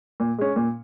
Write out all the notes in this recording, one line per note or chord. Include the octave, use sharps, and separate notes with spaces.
A#2
G#3 C#4
A#2